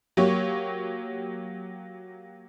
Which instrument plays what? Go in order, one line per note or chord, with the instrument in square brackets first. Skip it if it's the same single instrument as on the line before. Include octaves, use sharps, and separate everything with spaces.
[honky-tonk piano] F#3 A#3 G4 C#5